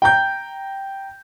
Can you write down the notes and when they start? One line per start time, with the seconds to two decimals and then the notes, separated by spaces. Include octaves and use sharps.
0.02 G5 A#5 G6